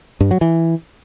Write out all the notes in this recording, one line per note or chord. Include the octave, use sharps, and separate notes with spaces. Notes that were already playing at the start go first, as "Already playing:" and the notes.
G2
F#3
E3